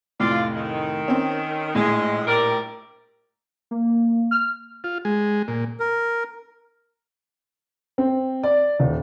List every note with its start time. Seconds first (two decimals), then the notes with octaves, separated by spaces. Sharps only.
0.20 F1 A2 F4 D5
0.55 D#3
1.08 C4 C#4
1.75 A#1 A2 G#3
2.27 G3 A#4 D5
3.71 A#3
4.31 F6
4.84 F4
5.05 G#3
5.48 A#2
5.80 A#4
7.98 C4
8.43 D5
8.79 D#1